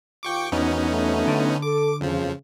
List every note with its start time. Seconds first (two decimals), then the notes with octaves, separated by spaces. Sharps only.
0.23 D#2 F4 G5 C#6 D6
0.52 E2 G#2 D#3 B3 C#4 D#4 F#4
0.88 C3 F#3 A3
1.27 D3
1.62 A4 D6
2.01 F2 C#3 F3